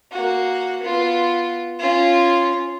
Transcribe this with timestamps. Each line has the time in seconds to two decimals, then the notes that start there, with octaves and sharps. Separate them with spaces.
0.12 A#3 F#4
0.82 B3 F4
1.79 C#4 F4